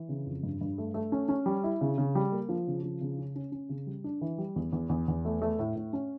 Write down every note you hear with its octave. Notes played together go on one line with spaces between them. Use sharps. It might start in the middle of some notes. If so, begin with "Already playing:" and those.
Already playing: E3
C#3
F2
G2
G2
A3
A3
C#4
C#4
G3
E4
C#3
C#3
G3
A#3
F3
C#3
F3
C#3
C#4
C#4
C#4
C#3
G3
D4
E3
G3
E2
E2
E2
E2
A3
A3
A2
A2
C#4